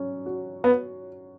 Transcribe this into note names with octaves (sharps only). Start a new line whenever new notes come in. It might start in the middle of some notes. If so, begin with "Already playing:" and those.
Already playing: F#3 C#4
F#4
B3